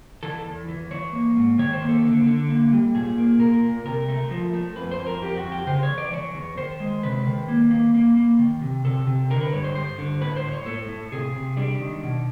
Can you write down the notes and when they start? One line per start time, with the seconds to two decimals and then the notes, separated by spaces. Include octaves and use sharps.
0.23 E3 A4
0.46 E2
0.68 E3
0.91 E3 C#5
1.13 A#3
1.37 G#2
1.58 D#3 C#5
1.73 C5
1.82 A#3
1.89 A4
2.04 D3
2.26 D3
2.49 A#3
2.73 G3
2.95 A#2 G#4
3.18 A#3
3.40 A#2 A#4
3.64 A#2
3.86 C3 A#4
4.09 A3
4.31 F3
4.53 A3
4.76 F2 B4
4.91 C5
4.99 F2
5.07 A#4
5.22 F2 G4
5.37 F#4
5.45 F2
5.52 G4
5.67 C#3 C5
5.83 C#5
5.90 E3
5.98 D5
6.12 E3 C#5
6.35 E2
6.57 D#3 C5
6.80 G#3
7.03 C3 B4
7.27 D#3
7.48 A#3
7.71 A#3
7.94 A#3
8.17 A#3
8.39 D#3
8.62 C3
8.85 C3 A4
9.07 C3
9.30 D3 A#4
9.41 B4
9.53 G2 C#5
9.64 C5
9.75 G2 C5
9.98 D3
10.21 A2 B4
10.36 C5
10.44 A2
10.52 C#5
10.66 A2 A4
10.89 A2
11.12 C3 G#4
11.34 C3
11.57 G3 D4
11.79 D#3
12.03 B2